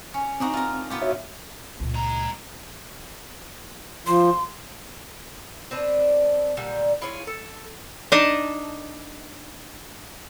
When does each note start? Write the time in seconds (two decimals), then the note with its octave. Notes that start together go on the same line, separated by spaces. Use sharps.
0.14 C#4
0.40 C4 D4 D#4 F#4
0.54 F4 A#4
0.90 B3 F4 G4
1.02 F#4 C#5 E5
1.80 C#2 A#2
1.94 G#3 A#5
4.07 F3 C6
5.71 C4 D4 B4
6.57 A#2 D3 G3
7.02 E4 F4 G#4 C#5
7.27 A4
8.12 D4 D#4 D#5 A5